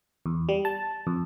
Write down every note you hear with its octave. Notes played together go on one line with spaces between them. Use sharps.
E2
G3
A5
F2